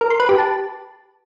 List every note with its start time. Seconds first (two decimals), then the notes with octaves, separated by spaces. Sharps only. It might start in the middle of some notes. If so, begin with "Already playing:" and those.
0.01 A#4
0.10 C6
0.20 B4
0.29 G4
0.38 A5